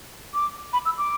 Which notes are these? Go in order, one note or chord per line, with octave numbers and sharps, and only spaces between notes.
D6
B5
E6
D6